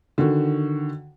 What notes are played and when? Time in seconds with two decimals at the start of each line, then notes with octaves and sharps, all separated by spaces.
0.18 D3 D#3 F#4